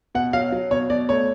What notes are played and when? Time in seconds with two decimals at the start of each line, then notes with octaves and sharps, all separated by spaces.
0.15 B2 F#5
0.33 F#3 F5
0.52 F#3
0.71 B2 C#5
0.90 B2 D5
1.09 A3 C#5